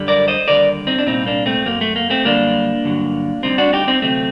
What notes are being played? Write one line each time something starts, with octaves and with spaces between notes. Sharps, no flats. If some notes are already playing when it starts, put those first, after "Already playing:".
Already playing: F#2 D3 G3
A#4 D5
C5 D#5
D#2 D3 G3 A#4 D5
C4 D#4
D4
C2 A#2 G3 C4 D#4
A#3 D4
A3 C4
F#2 F#3 A#3
A3
A#3
A3 C4
F#2 D3 G3 A#3 D4
G2 D3 F#3
D2 D3 G3 C4 D#4
D4 F#4
D#4 G4
C4 D#4
D2 C3 F#3 A3 C4